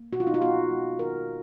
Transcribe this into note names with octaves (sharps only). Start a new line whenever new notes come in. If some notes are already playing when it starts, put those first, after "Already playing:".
Already playing: A#3
B2 F#4
F4
D#4
F4
B3 F#4
G#3
D#3 A#4